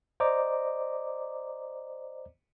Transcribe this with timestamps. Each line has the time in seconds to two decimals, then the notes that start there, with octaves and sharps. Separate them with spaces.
0.20 C5 D5 D#5 A#5 D6